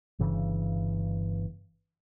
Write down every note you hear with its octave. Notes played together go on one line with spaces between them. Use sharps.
G1 G2 C#3 E3